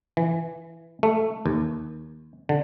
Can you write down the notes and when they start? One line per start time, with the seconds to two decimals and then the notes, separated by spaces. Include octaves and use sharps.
0.17 E3
1.03 A3
1.46 D#2
2.49 D3